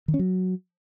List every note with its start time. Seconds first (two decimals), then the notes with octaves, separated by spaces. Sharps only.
0.08 D#3
0.14 C#4
0.19 F#3